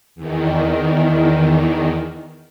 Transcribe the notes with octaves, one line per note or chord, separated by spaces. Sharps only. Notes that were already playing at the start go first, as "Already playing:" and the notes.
E2 D#3